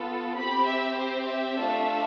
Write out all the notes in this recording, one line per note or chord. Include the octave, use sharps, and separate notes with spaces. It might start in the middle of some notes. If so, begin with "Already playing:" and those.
Already playing: B3 F4 A4
C4 G4 B5
E5
C5
E5
A3 D4 F4 A4